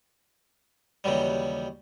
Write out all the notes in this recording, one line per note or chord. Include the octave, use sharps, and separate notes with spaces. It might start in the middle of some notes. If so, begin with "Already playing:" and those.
D#2 C#3 E3 F#3 G3